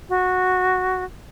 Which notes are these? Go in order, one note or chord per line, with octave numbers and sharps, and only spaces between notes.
F#4